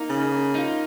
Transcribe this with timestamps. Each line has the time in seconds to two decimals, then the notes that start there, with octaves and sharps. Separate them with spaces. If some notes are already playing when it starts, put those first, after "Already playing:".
Already playing: A#3 D#4
0.09 C#3
0.32 A#3
0.55 D#4 F4